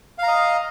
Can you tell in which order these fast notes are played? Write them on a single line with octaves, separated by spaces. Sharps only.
F5 A#5 D#5